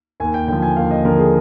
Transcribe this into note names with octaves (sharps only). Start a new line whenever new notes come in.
D#2 G#5
G5
D3 F3 G5
G#5
D#2 F5
D#5
D3 F3 A#4
G#4